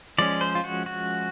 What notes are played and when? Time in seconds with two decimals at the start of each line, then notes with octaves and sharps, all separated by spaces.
0.18 F3 G#3 C#4 D5
0.41 C5
0.55 F4
0.64 F#4
0.86 F#4